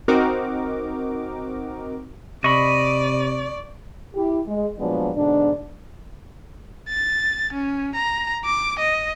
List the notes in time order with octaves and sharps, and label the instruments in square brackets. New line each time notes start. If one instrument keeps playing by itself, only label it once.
[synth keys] C4 D#4 F#4 A#4 D6
[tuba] C3 [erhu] D5 [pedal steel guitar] D#5 B5 [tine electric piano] C#6
[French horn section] E4 G4
G#3
A#2 F3 F#3 G#3 B3 D4
G#2 B2 D3 D4
[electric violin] A6
C#4
A#5
D6
D#5